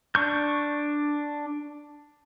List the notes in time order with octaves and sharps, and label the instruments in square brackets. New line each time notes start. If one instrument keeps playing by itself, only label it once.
[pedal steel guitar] D4 C#6 G6